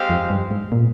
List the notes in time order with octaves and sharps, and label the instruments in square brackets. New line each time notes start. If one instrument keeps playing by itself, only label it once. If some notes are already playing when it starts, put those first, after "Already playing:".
Already playing: [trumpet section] G#3 C4 G4 C5 F5
[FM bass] F2
G2
G#2
A#2